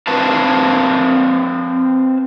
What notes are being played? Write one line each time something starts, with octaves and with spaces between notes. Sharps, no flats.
C4 B4 C5 F5 A5